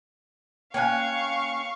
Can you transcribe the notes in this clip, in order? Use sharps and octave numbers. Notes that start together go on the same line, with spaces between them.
A#3 C#4 F5 G5 G#5 C#6 F#6